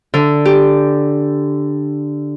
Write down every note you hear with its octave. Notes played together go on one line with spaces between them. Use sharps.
D3
G4